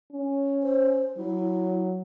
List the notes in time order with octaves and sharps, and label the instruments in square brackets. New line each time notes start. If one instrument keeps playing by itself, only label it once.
[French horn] C#4
[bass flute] C5
[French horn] F#3 [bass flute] E4